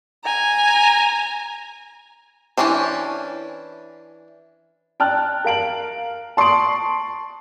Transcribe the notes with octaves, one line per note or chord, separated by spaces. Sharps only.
G#5 A#5
E3 A#3 C#4 D4 C5
G5 A5 F6 F#6
A#4 F5 D7 F#7
A5 C6 C#6 D#6 D7 F#7